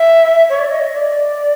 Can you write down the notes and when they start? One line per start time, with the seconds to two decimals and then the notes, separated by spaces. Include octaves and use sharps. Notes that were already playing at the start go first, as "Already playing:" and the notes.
Already playing: E5
0.49 C#5
0.59 D5
0.71 D#5
0.94 D5